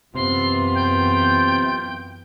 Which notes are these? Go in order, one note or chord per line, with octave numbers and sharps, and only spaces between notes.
F#2 C3 E3 B3 F4 C6
G5